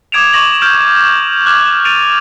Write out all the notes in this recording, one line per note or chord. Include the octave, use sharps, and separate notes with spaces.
D6 D#6 G#6 D7 E7 F7
C#6 D6 A#6 F#7
F6 G6 D7
D6 F6 F#6 G#6 F#7
A6 D7 D#7 F7